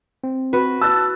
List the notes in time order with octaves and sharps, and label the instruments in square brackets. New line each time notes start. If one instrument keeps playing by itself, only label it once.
[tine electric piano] C4
[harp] F#4 B4
[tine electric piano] A5 [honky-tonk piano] E6 F#6 A6